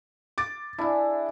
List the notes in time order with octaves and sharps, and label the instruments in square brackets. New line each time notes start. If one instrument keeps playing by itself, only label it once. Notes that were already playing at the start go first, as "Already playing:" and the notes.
[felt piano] D6 A6
[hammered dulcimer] D4 G#4 A5 [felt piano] E4 E5